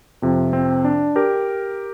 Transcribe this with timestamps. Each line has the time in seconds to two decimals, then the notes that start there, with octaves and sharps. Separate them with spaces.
0.22 F2 C3 F3
0.53 C4
0.84 D4
1.16 G4 A#4